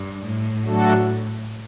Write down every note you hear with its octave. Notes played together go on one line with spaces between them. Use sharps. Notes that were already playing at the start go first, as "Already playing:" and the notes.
Already playing: G2
A2
F#3 A3 D4 F#4 A4